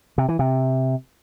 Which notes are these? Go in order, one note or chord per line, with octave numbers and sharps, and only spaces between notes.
C3
E3
C3